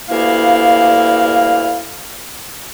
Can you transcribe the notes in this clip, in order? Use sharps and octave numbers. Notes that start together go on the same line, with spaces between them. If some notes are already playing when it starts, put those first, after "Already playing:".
D2 G2 A#3 E4 F5